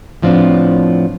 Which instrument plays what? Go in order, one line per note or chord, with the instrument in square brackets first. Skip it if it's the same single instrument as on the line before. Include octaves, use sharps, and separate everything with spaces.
[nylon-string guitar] A2 F3 B3 C4 D4